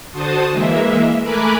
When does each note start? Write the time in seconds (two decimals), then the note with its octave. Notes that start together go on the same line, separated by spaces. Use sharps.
0.13 D3 F#4 C5 A5 D#6
0.51 E3 G#3 A#3 E5
1.22 A3 A#4 G#5 B5 D6 F#6